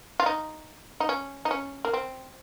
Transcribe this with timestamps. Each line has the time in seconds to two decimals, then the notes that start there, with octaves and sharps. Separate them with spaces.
0.20 F4
0.26 D#4
1.00 D#4
1.09 C#4
1.45 D#4
1.51 C#4
1.85 A#3
1.93 C4